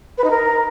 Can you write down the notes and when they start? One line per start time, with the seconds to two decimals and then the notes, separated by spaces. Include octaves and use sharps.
0.17 B4
0.24 D#4
0.30 A#4